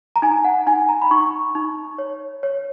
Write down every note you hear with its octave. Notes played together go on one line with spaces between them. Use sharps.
A#5
D#4 G#5
F#5
D#4 G#5
A#5
B5
D#4 C#6
D#4
C#5
C#5